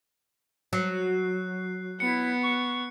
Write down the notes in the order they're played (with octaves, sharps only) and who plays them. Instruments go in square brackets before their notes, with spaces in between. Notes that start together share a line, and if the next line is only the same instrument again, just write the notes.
[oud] F#3 [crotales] F#6 C7
[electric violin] B3 [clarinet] E4 [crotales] C#7
[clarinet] C#6